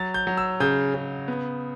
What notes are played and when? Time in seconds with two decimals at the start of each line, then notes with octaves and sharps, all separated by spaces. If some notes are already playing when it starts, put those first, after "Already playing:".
Already playing: F#3 A6
0.14 G6
0.27 F#3
0.37 E6
0.60 C#3 G6
0.94 C#3
1.28 B3